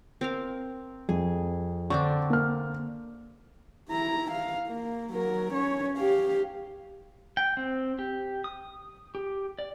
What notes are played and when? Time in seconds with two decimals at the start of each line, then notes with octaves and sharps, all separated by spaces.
0.21 C4 A#4 F5
1.09 F2 G#4
1.90 D3 C4 D4 C#6
2.30 A#3 F6
3.90 E4 A#5
4.31 F5
4.68 A#3
5.13 F#3 A#4
5.53 C#4 C#5
5.98 G4 F5
7.37 G5
7.57 C4
7.99 G4
8.44 D#6
9.15 G4
9.59 D5